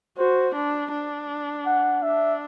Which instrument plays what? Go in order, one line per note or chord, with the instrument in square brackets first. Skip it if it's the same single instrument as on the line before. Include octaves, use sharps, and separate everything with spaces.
[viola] F#4 [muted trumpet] C5
[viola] D4
D4
[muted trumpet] F#5
[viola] D4 [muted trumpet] E5